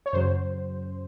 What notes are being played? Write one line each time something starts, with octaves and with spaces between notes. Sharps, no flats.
C#5
F#2 C#3 F#3 C5